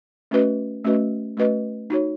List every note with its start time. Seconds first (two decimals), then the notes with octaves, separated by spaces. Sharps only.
0.31 A3 C#4 F#4 B4 D#5
0.84 A3 C#4 F#4 B4 D#5
1.37 A3 C#4 F#4 B4 D#5
1.90 D#4 F#4 C#5